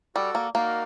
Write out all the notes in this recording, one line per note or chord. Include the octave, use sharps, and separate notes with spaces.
G3 F#4 A4 D5
A#3
A#3 D#4 F#4 A#4 D5 F5